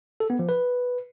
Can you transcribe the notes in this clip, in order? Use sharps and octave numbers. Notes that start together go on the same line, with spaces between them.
A4
B3
F3
B4